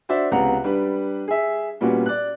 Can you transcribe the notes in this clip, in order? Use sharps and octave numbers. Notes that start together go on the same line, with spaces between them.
D4 F#4 C5 D5 E5
C#2 C3 B3 F#5 A#5
G3 D4 B4
G#4 E5
A#2 G3 B3 C#4 F#4
D5 F#6